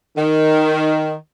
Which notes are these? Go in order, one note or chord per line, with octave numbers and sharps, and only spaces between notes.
D#3